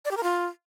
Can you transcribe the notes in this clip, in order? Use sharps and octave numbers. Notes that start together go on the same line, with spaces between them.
D5
G4
A#4
F4